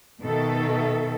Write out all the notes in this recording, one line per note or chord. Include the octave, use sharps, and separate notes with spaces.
B2 D#3 A4 E5